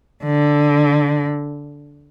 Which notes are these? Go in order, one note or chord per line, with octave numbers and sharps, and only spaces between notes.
D3